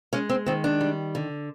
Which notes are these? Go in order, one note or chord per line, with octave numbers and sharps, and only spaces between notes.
G#3 C#4
C4
D#3 C4
D4
G3
D3